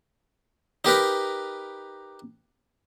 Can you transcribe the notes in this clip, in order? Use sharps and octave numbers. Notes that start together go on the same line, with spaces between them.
D#4 G4 A#4 B4